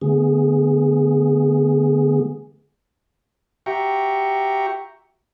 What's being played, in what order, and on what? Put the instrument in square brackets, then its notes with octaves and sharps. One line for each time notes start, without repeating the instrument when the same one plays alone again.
[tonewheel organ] D3 A3 B3 G#4
[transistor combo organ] F#4 G4 E5 G5 A#5 C#6